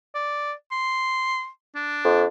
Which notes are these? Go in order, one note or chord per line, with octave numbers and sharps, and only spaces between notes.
D5
C6
D4
F2